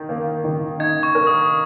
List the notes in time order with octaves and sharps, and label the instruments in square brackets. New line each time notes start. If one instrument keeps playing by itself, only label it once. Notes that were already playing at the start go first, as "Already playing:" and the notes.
Already playing: [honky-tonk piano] D#3
A#3
D#3
[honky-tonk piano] D#4 [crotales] G#6
[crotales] C#6
[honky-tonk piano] A#4
[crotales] D#6
D#6